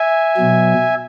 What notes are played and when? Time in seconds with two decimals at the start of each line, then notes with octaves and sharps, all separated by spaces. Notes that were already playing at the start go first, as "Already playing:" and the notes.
Already playing: E5 G#5
0.37 B2 F#3